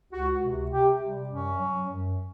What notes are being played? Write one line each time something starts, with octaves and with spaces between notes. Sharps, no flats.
C#2 F#4
C3
C3 G4
G3
F#2 C#4
F#3
F#2